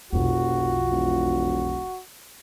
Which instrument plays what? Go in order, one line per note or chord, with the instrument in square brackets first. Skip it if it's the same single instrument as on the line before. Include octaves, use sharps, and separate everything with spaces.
[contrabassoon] F1 [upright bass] B1 F2 [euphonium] F4 [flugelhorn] F#4
[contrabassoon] E1